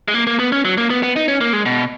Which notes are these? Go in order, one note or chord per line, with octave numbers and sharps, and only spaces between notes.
G#3
A#3
A#3
B3
C#4
F#3
A#3
B3
B3
D#4
C#4
A#3
G#3
B2